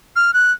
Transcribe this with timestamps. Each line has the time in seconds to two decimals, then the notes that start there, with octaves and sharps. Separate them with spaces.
0.16 F6
0.34 F#6